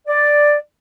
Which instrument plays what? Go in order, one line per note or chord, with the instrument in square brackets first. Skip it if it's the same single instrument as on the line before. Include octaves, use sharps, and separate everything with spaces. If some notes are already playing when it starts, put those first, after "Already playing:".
[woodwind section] D5